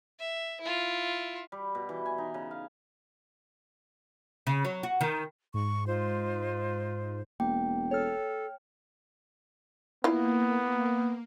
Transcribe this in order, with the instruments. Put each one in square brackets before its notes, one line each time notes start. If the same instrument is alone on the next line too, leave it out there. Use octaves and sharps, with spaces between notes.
[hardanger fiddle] E5
E4 F4
[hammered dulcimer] G3
B2
E3
G#5
D#4
C#3
F5
[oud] C#3
F#3
F#4
D#3
[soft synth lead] G#2 [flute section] C#6
[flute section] D#4 F4 C5
[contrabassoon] E1 [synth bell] A#3 [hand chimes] G5
[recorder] A4 [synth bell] C#5 F6
[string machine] A#3 [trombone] B3 [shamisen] E4 F4